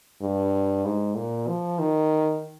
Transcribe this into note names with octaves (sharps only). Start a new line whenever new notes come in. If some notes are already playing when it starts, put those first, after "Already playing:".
G2
G#2
A#2
F3
D#3